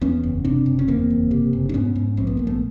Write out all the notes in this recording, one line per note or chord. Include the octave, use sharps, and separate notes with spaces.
E2 B3 C#4
F#1
C3 C4 D4
F#1
C#4
E2 A#3 C4
F#1
C3
F#1
D4
G#2 B3 C#4
G#2
A#1 C4
B3
A#1 A#3
A3 B3